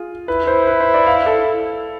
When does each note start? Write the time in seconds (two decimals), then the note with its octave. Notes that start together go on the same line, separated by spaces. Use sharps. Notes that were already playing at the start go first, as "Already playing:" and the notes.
Already playing: F4 G#4
0.28 E4 B4
0.47 C5
0.67 B4
0.80 C5
0.94 D5
1.06 F5
1.26 A4